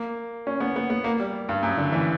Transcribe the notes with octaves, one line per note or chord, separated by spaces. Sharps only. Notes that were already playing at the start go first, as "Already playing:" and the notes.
Already playing: A#3
C#4
B3
B3
B3
A#3
G3
G2
F#2
D3
E3